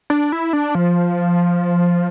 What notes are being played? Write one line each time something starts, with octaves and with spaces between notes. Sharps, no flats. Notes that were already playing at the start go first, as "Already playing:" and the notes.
D4
E4
D4
F3